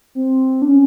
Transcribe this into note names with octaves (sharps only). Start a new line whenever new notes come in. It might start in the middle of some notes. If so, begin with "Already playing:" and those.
C4
D4
C#4